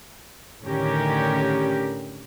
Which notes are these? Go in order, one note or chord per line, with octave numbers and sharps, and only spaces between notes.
A2 D3 D#3 C#4 G4 A#4